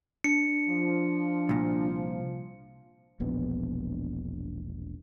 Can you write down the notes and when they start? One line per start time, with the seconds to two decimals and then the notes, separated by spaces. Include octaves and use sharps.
0.24 D4 C#7
0.69 F3
1.49 C2 A#2
3.20 E1 A#1 B3